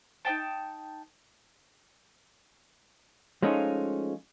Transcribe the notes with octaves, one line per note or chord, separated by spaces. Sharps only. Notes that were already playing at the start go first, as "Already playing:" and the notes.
D#4 D#5 G5 A5
F3 G#3 A3 C#4 D#4 F4